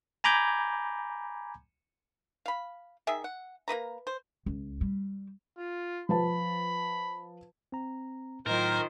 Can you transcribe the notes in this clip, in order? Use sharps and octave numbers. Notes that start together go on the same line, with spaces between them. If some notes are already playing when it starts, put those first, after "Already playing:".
G#5 A#5 B5 D6 G6 G#6
F5 B5
D#3 G#4 E5
F#5
A#3 D#4 B4 A#5
C5
C#2
G3
F4
F3 B4 A5 B5
C4 A#5
A2 D#3 F#3 F4 A#4 C5